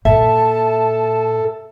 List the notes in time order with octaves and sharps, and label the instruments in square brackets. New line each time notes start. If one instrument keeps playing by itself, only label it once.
[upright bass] A#2 [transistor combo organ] A4 [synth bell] E5 [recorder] A5